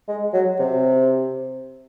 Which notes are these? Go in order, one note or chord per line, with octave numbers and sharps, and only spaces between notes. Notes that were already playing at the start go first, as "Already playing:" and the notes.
G#3
F#3
C3